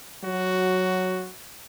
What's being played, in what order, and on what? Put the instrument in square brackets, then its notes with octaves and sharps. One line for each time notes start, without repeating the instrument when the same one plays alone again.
[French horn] F#3 [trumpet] F#4